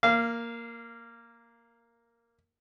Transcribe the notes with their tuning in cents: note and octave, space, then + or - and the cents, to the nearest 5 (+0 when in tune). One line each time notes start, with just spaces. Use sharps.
A#3 +0 F5 -20